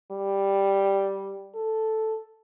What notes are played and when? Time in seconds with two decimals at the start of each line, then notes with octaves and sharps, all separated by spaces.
0.11 G3
1.55 A4